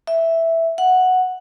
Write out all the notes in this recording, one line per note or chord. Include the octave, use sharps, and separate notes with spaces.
E5
F#5